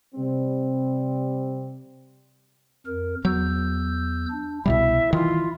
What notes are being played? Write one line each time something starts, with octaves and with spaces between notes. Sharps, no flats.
C3 G3 C4
F2 A#4
E2 F#3 E6 G6
D4
C2 B2 G3 E4 E5
D#3 E3 F4